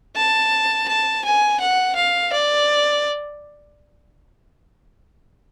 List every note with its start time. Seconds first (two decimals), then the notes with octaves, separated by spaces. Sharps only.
0.16 A5
0.88 A5
1.25 G#5
1.60 F#5
1.96 F5
2.33 D5